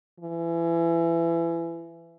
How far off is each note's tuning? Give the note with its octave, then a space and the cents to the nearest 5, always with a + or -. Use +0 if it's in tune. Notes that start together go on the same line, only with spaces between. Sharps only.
E3 +25